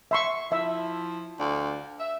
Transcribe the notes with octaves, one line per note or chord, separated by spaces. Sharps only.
E5 C6 C#6
F3 E4 E5
D2 D5 F5
E5